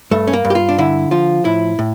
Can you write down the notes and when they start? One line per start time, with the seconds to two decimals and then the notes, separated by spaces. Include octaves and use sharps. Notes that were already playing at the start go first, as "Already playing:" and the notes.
0.11 G2 A3
0.27 C#4
0.33 A#3
0.45 G2
0.50 G4
0.55 F4
0.69 D4
0.78 D3 E4
1.11 F3 F4
1.45 A2 E4
1.79 A2